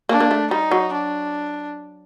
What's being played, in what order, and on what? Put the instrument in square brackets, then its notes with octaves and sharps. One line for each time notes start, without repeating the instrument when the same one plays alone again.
[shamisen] A#3 [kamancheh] D4
[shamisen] A#3
A3
[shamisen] G3 [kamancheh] D#4
[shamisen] F#3
[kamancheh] D4